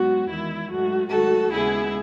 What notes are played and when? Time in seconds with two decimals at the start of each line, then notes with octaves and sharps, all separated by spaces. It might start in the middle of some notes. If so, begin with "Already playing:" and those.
Already playing: G#2 F#3 B3 F#4
0.28 E2 D#3 G#3 E4
0.68 G#2 F#3 A3 F#4
1.09 G#2 D#3 F#3 A3 F#4 A4
1.51 D#2 C#3 G#3 B3 E4 G#4